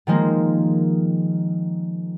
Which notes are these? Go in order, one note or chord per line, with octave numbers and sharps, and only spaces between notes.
D#3 F3 G#3 A#3